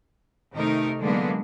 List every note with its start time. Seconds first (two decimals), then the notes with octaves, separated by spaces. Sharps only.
0.54 C3 D#3 A3 D#4 A#4
0.99 D3 F#3 G#3 A#3 B3 D4